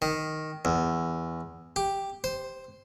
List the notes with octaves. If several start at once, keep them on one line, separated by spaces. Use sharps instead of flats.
D#3
E2
G4
C5